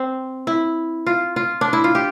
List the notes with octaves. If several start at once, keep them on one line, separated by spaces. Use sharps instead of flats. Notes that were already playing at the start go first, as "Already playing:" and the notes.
Already playing: C4
E4
F4
F4
D4
E4
F4
G4